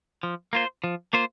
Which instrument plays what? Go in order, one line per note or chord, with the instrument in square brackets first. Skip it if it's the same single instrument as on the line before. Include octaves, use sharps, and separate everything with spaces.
[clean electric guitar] F3
A#3 F4 C5
F3
A#3 F4 C5